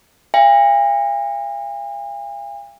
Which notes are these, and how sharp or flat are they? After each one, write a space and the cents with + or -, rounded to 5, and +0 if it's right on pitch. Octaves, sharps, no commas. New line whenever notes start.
F5 -35 G#5 -45